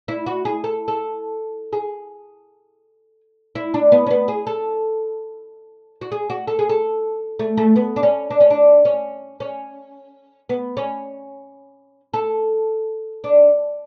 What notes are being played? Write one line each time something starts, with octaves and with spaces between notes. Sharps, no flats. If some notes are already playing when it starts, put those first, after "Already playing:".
E4
F#4
G#4
A4
A4
G#4
E4
D4
B3
C#4
B3
G#4
A4
F#4
G#4
F#4
A4
G#4
A4
A3
A3
B3
D4
C#4
D4
C#4
D4
C#4
C#4
B3
C#4
A4
D4